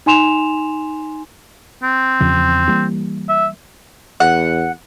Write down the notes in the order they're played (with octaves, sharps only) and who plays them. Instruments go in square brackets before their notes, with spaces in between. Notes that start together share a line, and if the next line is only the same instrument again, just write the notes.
[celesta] D#4 G#5 C6 E7 F7
[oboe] C4
[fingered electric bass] E2 C#3 F3
E3 G3 A#3
[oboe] E5
[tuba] E2 [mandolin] F#5